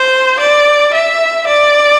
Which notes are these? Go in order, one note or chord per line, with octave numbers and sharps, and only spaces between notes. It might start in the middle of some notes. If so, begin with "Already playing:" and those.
Already playing: C5
D5
E5
D5